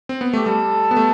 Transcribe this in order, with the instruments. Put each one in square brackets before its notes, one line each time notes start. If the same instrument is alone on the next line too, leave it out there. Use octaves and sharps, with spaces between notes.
[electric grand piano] C4
B3
[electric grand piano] A3 [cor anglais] G4
[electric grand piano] G3 [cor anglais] A4
[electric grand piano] B3
A3